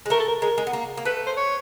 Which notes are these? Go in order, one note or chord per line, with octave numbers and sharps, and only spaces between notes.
G#3
A3 A#4
A4
A#4
G#3 A#4
G#3
B3
A#3
A#3
A3 B4
B4
C5
C#5